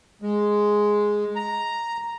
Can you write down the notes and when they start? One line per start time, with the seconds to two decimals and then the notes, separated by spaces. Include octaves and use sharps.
0.22 G#3
1.36 A#5